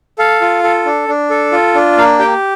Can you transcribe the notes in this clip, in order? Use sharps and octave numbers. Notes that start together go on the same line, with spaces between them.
A4 F5
F4
A4
D4
D4
A4
F4
D4
A#3 F5
G4 G5